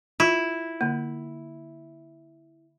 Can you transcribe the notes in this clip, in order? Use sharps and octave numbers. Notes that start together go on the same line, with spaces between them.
E4 F4
D3 A#3